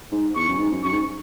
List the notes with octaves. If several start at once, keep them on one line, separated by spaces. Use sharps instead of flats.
G#2
E2 C#6
F#2
G#2
F#2
F#2 C#6
G#2